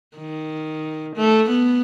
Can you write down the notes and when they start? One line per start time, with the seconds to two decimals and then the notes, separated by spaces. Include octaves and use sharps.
0.17 D#3
1.15 A3
1.49 B3